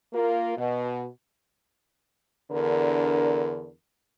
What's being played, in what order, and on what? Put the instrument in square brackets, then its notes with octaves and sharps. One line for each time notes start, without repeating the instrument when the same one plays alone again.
[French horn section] A#3 F4 A#4
B2
E2 D3 D4 A#4